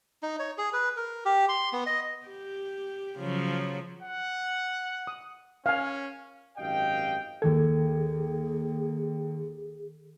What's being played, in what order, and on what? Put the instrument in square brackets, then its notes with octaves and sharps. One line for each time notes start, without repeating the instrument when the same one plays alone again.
[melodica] D#4
C#5
G#4
B4
A#4
G4
C6
B3
D#5
[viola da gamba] G4
C#3 F3 F#3
[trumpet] F#5
[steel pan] D#6
[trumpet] C#4 [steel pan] F5 G#5
[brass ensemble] G#1 F#2 G4 D#5 F5 G5
[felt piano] D#2 G#6 [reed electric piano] D#3 A4 [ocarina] G#4